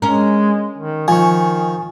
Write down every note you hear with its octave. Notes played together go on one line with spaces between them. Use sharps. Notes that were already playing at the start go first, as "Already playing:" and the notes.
G#3 C#4 A#4
D#3
D#3 F3 G#5 C#6